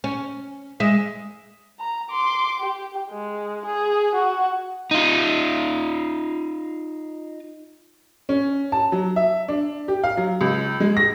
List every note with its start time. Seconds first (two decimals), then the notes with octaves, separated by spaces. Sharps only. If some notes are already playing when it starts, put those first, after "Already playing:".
0.04 C#4
0.80 G#3 E5
1.79 A#5
2.11 C6 D6
2.60 G4
3.10 G#3
3.66 G#4
4.15 F#4
4.91 D#4 F4
8.29 C#4
8.72 A5
8.92 F#3
9.16 E5
9.48 D4
9.88 G4
10.04 F5
10.17 F#3
10.41 C#2
10.80 G#3
10.97 A#6